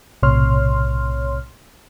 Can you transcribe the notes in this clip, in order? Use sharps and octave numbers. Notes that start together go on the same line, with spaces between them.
B1 A2 C3 C#5 C6 F6